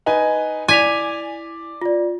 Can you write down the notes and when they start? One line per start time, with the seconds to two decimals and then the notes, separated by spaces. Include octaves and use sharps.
0.06 D#4 B4 G#5
0.68 E4 D5 G#5 B6 F7
1.82 F4 D5